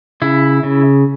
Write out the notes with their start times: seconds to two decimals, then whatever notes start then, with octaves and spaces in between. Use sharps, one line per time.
0.22 C#3 E4
0.63 C#3